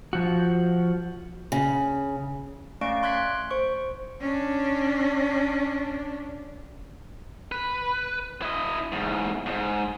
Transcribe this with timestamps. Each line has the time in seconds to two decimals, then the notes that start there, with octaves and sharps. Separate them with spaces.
0.13 F3 F#4
1.52 C#3
2.81 A3 C#4 D5 F5 C#6 D7
3.03 C6 F#6 G#6 B6
3.51 C5 C#6
4.21 C#4 D4
7.52 B4
8.42 E4 D#5
8.92 E2 G#2
9.46 F2 G#2